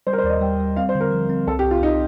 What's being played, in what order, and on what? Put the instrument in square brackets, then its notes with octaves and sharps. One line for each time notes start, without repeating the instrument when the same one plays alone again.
[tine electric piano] G3 [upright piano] C5
[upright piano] A#4
C5
[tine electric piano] D#2 [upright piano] D5
[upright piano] D#5
[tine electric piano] G3 [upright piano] G5
[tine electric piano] G3
[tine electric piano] C4 [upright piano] F5
[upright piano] C5
[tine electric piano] D3
[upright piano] A#4
[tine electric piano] F3
C4
[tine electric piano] C2 [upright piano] A4
[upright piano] G4
[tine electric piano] C2
[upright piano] F4
[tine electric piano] C2 [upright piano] D#4